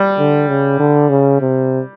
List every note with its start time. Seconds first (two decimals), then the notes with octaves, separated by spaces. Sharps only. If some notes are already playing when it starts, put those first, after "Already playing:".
Already playing: G3
0.18 D3
0.48 C#3
0.79 D3
1.09 C#3
1.41 C3